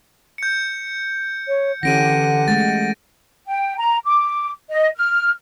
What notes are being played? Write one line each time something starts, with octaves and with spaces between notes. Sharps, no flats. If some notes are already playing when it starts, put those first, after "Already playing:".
G6 C#7
C#5
D3 E3 C#4 G4 F#5 A#6 D7 D#7
G#3 A3 A6
G5
A#5
D6
D#5
F6